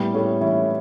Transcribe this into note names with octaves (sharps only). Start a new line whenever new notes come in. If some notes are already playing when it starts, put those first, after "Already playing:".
Already playing: A2 G3 B3
A2 A3 C#4
E3 C#4 E4